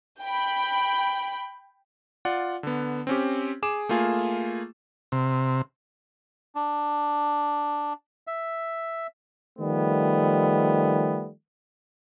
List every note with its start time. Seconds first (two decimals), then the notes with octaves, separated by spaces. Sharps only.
0.22 G5 B5
2.25 F4 D5 F#5
2.63 D3 B3
3.07 C4 C#4 G4
3.63 G#4 D6 E7
3.89 A3 A#3 F4 G#4
5.12 C3
6.55 D4
8.27 E5
9.59 D#3 F3 G3 A3 B3